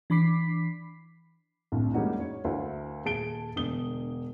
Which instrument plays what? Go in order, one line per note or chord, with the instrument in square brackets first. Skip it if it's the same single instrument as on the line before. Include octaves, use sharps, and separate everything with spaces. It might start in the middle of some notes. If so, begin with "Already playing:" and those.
[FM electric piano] E3 D4 B5 D6 B6 C7
[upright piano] C2 A2 D3
G3 G#3 A#3 C#4 D#4 F#4
C#5
D2 E4 F#4 A#4 F5
D#1 G#4 A5 D7 G7
E1 D3 D#6 G7